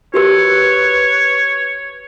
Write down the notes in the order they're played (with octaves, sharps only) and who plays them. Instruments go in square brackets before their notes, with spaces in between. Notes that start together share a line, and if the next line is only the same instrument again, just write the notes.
[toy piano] F#4 G4 A#4 [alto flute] B4 [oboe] C#5